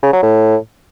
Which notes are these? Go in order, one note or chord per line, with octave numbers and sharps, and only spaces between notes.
C#3
F#3
A2